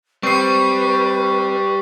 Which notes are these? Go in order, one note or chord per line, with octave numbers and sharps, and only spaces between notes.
G3 C4 B4 C#6 C7